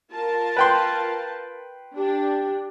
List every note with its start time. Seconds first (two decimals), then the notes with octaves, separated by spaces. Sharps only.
0.12 F4 A#4 A5
0.57 B4 G5 C6
1.97 D4 G4